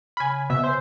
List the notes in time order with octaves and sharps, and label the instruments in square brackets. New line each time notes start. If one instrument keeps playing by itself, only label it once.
[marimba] C#3 F6 [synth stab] G#5 B5
[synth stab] B2 [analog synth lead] E5
[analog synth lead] C5 [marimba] C#5 G#5 G6